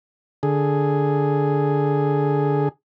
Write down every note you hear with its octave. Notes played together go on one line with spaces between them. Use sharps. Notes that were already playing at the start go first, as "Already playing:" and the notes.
D3 G#4